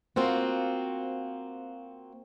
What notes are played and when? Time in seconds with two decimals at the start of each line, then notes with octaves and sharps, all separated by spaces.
0.16 A#3 C4 F4 F#4